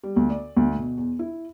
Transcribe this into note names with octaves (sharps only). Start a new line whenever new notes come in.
G3
D2
D5
D2
B2
E2
E4